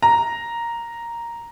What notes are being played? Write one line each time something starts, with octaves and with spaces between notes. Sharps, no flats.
A#5